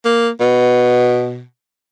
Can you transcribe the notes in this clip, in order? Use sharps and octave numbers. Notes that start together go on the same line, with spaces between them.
A#3
B2